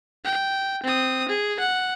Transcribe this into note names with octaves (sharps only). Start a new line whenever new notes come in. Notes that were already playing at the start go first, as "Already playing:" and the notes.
G5
C4 D#6
G#4
F#5